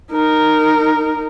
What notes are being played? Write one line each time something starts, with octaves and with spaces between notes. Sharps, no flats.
D#4 A#4